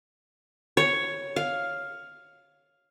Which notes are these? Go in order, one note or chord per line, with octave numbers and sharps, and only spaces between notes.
C#5
F5